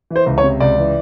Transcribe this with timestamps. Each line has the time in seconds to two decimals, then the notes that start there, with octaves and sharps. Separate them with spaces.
0.11 E3
0.16 C5
0.26 C#2
0.38 C#5
0.43 C3
0.60 C#2 D5
0.78 E3